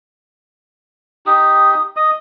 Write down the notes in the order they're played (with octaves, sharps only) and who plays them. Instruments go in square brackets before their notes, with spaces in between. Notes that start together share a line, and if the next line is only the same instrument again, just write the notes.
[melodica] D#4 G4 [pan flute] D#6
[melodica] D#5 D#6